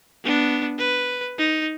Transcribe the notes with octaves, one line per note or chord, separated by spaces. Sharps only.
B3 D4
B4
D#4